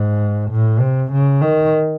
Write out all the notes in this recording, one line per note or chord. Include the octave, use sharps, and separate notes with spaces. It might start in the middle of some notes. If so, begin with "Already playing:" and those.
Already playing: G#2
A2
C3
C#3
D#3